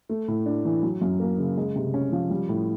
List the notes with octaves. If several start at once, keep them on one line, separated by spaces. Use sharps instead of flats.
A3
A2
D4
E3
F#3
F#2
A#3
C#3
G#3
C3
C#4
F3
G3
A2